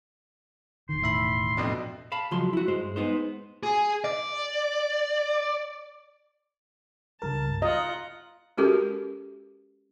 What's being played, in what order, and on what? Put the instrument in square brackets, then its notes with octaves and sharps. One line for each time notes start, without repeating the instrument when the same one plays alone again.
[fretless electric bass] E1 D#3 [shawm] C6
[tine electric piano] A2 E5 B5
[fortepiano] F2 B2 D4
[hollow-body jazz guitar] F5 A5 B5
C#2 F3 F#3 G#3 C6
E4 F#4
G2 G#3 C5
G#3 B3 D#4 C5
[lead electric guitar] G#4
D5
[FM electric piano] C#2 G2 A#4 [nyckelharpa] A5
[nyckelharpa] F4 F#5 [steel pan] D#5 [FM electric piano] A#5
[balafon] G#3 C#4 F#4 G4 A4 A#4